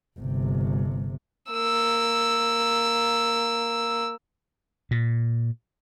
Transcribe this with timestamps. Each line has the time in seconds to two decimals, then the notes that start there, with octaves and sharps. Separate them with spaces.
0.19 G1 C3
1.51 A#3 E6
4.91 A#2